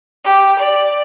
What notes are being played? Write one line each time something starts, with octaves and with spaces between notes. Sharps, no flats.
G4
D5